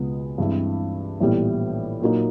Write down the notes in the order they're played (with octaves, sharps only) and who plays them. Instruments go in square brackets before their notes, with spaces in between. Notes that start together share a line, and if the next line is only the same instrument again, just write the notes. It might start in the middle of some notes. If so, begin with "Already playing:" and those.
Already playing: [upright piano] C#2 B2 G#3 B3
G2 E3 G#3 C4 E4
A#1 A2 E3 G3 B3
A#2 F#3 A#3 D#4